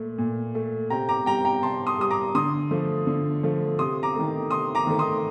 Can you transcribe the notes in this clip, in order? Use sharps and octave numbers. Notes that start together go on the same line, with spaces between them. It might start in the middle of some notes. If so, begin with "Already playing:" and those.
Already playing: A#2 A3
A#2
A3
C3 G5 A#5
A#5 D6
G3 G5 A#5
G5 A#5
C3 A5 C6
C6 D#6
G3 D#6
A#5 D6
D3 C6 D#6
F3 A3
D3
F3 A3
C3 C6 D#6
A#5 D6
D#3 A3
C3 C6 D#6
A#5 D6
D#3 A3
C6 D#6